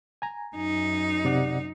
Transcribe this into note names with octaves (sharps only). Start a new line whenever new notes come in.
G#5 A#5
F#2 D#4
C3 D5 F#5